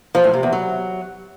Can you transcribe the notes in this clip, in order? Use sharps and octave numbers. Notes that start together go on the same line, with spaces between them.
F3
A2
C3
E2
F#3